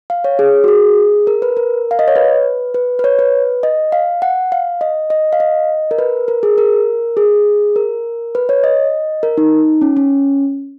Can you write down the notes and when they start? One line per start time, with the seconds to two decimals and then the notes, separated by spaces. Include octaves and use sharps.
0.10 F5
0.24 C#5
0.39 G#4
0.64 F#4
0.68 G#4
1.27 A#4
1.42 B4
1.57 A#4
1.91 F5
1.99 D#5
2.08 C#5
2.16 B4
2.74 B4
2.99 B4
3.04 C#5
3.19 B4
3.63 D#5
3.92 F5
4.22 F#5
4.52 F5
4.81 D#5
5.10 D#5
5.33 F5
5.40 D#5
5.91 A#4
5.99 B4
6.28 A#4
6.43 G#4
6.58 A#4
7.17 G#4
7.76 A#4
8.35 B4
8.49 C#5
8.64 D#5
9.23 A#4
9.38 D#4
9.81 C#4
9.97 C#4